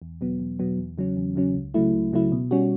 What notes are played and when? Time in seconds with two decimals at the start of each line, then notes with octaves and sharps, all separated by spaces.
0.02 E2
0.21 B2 F#3 B3
0.39 E2
0.59 B2 F#3 B3
0.78 E2
0.98 C#3 F#3 C#4
1.17 E2
1.36 C#3 F#3 C#4
1.55 C#2
1.74 C#3 F#3 A3 E4
1.93 C#2
2.13 C#3 F#3 A3 E4
2.32 B2
2.51 G3 C#4 F#4